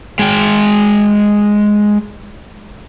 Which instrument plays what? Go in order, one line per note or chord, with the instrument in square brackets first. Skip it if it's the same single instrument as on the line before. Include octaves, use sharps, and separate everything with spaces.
[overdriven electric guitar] G#3 G5